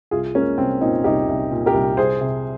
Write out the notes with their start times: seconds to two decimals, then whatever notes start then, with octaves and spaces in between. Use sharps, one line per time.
0.11 C2 F4 G#4
0.35 G#3 A#3 C#4
0.58 C2 C4
0.81 A#2 C4 D#4
1.04 C2 D#4 G4
1.28 C2
1.51 A#2
1.66 G4 A#4
1.74 C2
1.97 C2 G#4 C5
2.21 C3